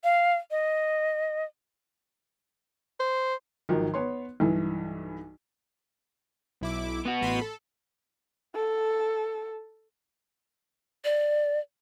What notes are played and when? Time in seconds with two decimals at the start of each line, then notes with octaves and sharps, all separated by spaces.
0.04 F5
0.51 D#5
3.00 C5
3.69 G#1 D#3 F3 F#3
3.94 B3 C#5 C6
4.40 B1 G2 E3
6.61 B1 E4 D6
7.06 B3 F#4
7.21 A1 B5 C6
7.41 A4
8.55 A4
11.05 D5